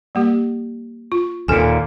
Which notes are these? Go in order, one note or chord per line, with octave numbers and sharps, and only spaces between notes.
G3 A#3 G4
F4
D#2 A#2 A4 G#5